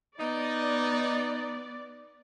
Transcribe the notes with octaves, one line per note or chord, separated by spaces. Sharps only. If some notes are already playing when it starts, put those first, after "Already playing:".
B3 D#4 D5